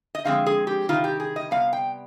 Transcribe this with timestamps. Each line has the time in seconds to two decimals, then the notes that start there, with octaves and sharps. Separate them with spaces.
0.15 D#5
0.25 D3 F3 G#3 C4 F5
0.47 G#4
0.67 G4
0.89 C3 D#3 G3 F4
1.04 G4
1.20 G#4
1.36 D#5
1.51 C3 G3 B3 F5
1.73 G5